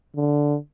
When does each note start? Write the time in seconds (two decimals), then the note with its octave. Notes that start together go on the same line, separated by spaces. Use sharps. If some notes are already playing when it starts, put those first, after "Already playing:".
0.16 D3